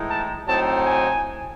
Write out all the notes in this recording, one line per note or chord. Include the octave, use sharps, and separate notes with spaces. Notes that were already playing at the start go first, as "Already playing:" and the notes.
Already playing: A2 E3 G#3 D#4
A5
A2 F#3 C4 D#4 A5
G#5